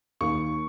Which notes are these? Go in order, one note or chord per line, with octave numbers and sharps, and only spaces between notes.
D#2 C#6